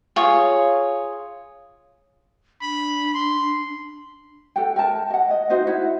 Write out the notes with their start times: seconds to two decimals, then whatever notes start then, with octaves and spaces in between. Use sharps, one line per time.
0.16 F4 G#4 C#5
2.61 D4 B5
3.14 C6
4.56 A4 F#5 G5
4.76 A#4 G5 A5
5.10 D#5 F#5
5.31 D#5
5.50 D#4 F#4 C5 D#5
5.67 E4 F#5